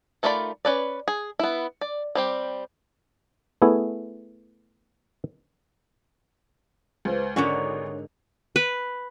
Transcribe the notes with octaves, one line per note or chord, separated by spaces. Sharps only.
D#3 A3 F4 D5 B5
C#4 B4 D5
G#4
B3 E4
D5
G3 C4 G4
A3 B3 E4 G#4
C#2 B4 C5 F5
G#1 G#2 D3 C#4 A#4 C#5 F#5 F7
B4